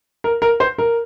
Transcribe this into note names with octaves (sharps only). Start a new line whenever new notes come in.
A#4
A#4
C5
A#4